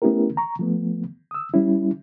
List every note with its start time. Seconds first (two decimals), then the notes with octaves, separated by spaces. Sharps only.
0.02 A3 B3 C#4 E4 G4 A#4
0.37 A#5 C#6
0.59 F3 A3 B3
1.31 D#6 E6
1.54 G3 C#4 E4